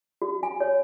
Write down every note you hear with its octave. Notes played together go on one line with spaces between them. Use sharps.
F#4
G#5
C#5